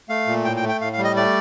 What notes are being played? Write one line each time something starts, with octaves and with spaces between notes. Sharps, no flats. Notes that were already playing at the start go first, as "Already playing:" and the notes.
A3 F5
A#2
A2 G5
G5
A3
G5
A2 F5
F5
G3
D#5
A3 D5